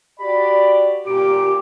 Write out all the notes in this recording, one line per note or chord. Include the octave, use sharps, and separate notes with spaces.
F#4 G4 D5 B5
A#2 G4 D6